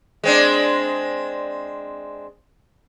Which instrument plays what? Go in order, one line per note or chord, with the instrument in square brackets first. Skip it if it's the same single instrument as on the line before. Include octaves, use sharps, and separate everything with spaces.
[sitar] G#3 C4 D4